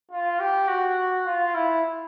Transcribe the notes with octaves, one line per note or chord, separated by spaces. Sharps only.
F4
G4
F#4
F4
E4